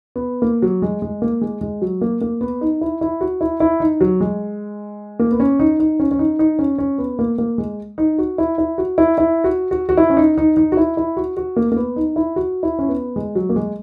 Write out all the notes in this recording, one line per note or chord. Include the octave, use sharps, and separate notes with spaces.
B3
A#3
F#3
G#3
G#3
A#3
G#3
G#3
F#3
A#3
A#3
B3
D#4
E4
E4
F#4
E4
E4
D#4
F#3
G#3
A#3
B3
C#4
D#4
D#4
C#4
C#4
D#4
D#4
C#4
C#4
B3
A#3
A#3
G#3
D#4
F#4
E4
E4
F#4
E4
E4
F#4
F#4
F#4
E4
C#4
D#4
D#4
D#4
F#4
E4
E4
F#4
F#4
A#3
A#3
B3
D#4
E4
F#4
E4
C#4
B3
G#3
F#3
A#3
G#3